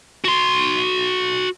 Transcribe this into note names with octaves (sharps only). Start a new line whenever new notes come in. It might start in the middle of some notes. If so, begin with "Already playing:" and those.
F#4 C6